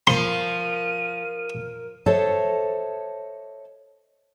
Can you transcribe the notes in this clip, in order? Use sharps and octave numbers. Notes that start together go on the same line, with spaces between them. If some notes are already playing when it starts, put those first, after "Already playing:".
F3 A#4 C6 D#7
A4 C5 C#5 D#5 E5 A5